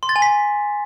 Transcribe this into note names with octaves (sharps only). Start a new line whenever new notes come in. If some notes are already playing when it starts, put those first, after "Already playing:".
C6
A6
G#5
B6